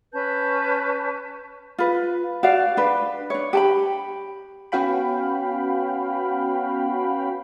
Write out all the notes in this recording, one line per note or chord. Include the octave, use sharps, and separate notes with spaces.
C#4 B4 A5 G6
F4 B4
F#4 D5 F5
D4 B4
D4 C#5
G4 A5 B5
B3 C#4 F#4 F5 G5 B5